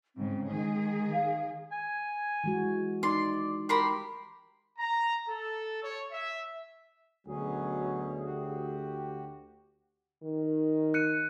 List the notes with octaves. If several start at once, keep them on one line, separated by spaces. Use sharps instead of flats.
G#2 C#3 C4
D#3 G#3 G#4
F5
G#5
E3 G#3 F#4
D#4 D5 C6
G4 A#4 B5 C6
A#5
A4
C#5
E5
D2 B2 F#3 C#4 G#4
F#4 G4
D#3
F#6 C#7 D#7